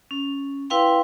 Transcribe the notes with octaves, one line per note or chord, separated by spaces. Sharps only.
C#4
E4 B4 F5 G5 C6